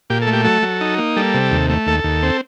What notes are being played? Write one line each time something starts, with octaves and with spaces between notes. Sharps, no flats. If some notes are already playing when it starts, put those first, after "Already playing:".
A#2 G4
A4
A3
G4
F#3 A4
F#3
D#4
A#3
G3 A4
C3
D#2
A3
D#2 A4
D#2
C4